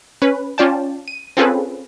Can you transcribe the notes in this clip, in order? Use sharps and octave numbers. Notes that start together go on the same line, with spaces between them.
C#4 B4
C#4 F4 D5 G5 A5
D#7
C4 C#4 F4 G#4 A4 B4